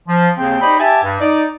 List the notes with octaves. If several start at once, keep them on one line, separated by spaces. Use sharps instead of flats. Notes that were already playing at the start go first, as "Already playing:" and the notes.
F3
D#2 C#3 C4 G5
D#4 G4 C5 D5 D#5 B5
G4 E5 G#5 A5
G2
D#4 D5